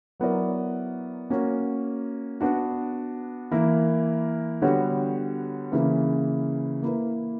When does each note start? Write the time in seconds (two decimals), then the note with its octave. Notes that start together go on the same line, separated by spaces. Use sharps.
0.20 F#3 B3 E4 A#4 D5
1.30 A#3 C#4 F#4
2.40 B3 D4 F#4
3.51 E3 A#3 E4 A#4
4.62 D3 G3 B3 F#4 C#5
5.72 C#3 E3 A#3 E4 B4
6.83 A#3 E4 B4